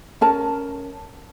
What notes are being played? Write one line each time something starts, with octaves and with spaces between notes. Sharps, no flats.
C#4 A#4 A5